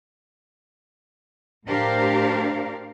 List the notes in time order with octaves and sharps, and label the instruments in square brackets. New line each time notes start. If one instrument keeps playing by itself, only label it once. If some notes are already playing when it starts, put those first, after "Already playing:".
[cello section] A2 D4 G4 A#4 C5 F5